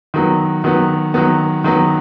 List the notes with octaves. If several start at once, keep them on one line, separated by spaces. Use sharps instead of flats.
D#3 F#3 B3
D#3 F#3 B3
D#3 F#3 B3
D#3 F#3 B3